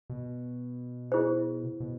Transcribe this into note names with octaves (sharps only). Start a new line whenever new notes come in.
B2
E4 G#4 C5
B2